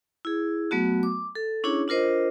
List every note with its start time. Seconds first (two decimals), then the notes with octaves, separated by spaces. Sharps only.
0.25 E4 G#4
0.71 F#3 A3 B3 F#4
1.03 D6
1.35 A4
1.64 C#4 D4 E4 G#4 C#5
1.88 D4 F4 A#4 C5 D#5